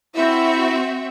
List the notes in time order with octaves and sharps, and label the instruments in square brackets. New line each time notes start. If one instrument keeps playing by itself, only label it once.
[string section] C4 F#4 E5 [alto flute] E4